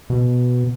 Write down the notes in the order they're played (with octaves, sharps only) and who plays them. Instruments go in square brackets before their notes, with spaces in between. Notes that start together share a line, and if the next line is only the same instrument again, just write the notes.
[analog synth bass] B2